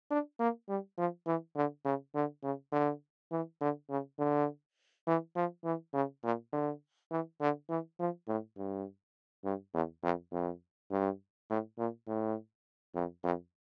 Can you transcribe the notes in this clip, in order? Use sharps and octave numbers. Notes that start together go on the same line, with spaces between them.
D4
A#3
G3
F3
E3
D3
C#3
D3
C#3
D3
E3
D3
C#3
D3
E3
F3
E3
C#3
A#2
D3
E3
D3
E3
F3
A2
G2
G2
E2
F2
F2
G2
A2
A#2
A2
F2
F2